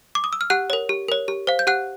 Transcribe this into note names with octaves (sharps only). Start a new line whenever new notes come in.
D6
D#6
E6
F6
G4 F#5 F#6
A#4 C#5
G4
A#4 C#5
G4
C5 F5
G6
G4 F#5 F#6